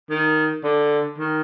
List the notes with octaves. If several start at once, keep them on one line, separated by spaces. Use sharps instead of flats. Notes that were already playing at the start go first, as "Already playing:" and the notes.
D#3
D3
D#3